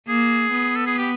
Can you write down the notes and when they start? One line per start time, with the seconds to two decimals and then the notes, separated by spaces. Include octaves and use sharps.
0.08 A#3 G#4
0.52 B3
0.76 A4
0.86 G#4
0.98 G4